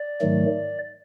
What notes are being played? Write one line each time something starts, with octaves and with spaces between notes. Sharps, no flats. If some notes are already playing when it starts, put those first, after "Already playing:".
Already playing: D5
G#2 D#3 F#3 A3